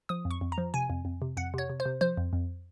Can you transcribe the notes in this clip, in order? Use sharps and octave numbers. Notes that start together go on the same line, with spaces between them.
F3 D#6
F2
C#6
F2
A#5
F3
C3 G#5
F2
F2
C3
F2 F#5
C3 C#5
C3
C5
C3
F3 C5
F2
F2